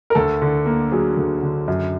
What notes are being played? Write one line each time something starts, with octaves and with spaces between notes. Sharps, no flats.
A#4
D2 A4
D3
A#3
F#3 G#4
D2
D3
F#2